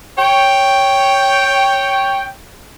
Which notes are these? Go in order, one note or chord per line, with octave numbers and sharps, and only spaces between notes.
C#5 G5